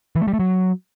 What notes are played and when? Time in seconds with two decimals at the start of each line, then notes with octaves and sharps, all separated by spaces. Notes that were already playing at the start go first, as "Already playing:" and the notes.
0.16 E3
0.22 A3
0.28 G3
0.34 A3
0.40 F#3